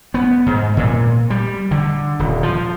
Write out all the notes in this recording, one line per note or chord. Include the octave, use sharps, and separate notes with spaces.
B3
G#2
A#2
G3
D3
D#1
F3